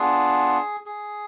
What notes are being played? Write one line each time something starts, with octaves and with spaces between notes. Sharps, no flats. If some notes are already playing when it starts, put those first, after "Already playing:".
Already playing: B3 D4 F4 G#4
G#4